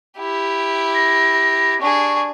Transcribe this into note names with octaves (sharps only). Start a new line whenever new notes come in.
E4 G4
A#6
D4 G#4 C#6